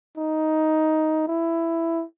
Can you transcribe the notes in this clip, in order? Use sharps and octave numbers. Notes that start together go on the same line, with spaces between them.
D#4
E4